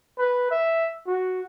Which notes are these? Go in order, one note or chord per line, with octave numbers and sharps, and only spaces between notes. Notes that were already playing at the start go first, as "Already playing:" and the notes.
B4
E5
F#4